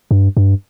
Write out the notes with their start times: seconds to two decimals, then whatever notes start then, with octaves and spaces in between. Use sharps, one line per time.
0.11 G2
0.37 G2